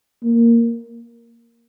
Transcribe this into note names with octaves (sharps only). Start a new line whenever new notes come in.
A#3